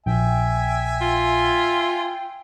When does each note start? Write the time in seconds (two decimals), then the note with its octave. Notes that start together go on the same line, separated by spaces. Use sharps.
0.06 A#1 E5 G5 G#5
1.01 F4